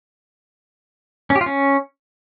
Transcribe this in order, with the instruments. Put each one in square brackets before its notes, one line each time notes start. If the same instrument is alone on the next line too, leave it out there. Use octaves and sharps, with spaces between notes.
[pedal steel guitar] C#4
G4
F4
C#4